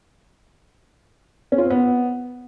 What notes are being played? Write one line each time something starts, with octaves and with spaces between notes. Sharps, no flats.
C#4
F4
C4
B3